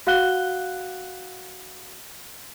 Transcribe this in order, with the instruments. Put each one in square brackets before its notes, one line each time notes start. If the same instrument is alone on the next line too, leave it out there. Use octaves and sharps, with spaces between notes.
[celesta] F#4 F5 F#5 F#6 G7